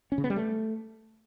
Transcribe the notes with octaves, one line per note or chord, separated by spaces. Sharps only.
C#4
C#3
B3
G3
A3